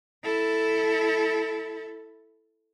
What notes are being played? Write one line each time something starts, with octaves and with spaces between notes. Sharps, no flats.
E4 A4